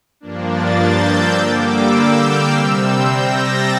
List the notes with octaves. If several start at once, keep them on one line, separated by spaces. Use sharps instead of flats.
G2 F3 A#3 D4
A6
G6
E6
D3 G3 A#3 D6
E6
G6
F6
C3 G3 C4 E6
G6
A#6
A6